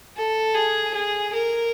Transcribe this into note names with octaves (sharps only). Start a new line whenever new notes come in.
A4
G#4
G#4
A#4